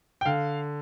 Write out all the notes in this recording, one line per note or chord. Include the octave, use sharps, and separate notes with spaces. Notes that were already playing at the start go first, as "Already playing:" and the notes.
G5
D3 F5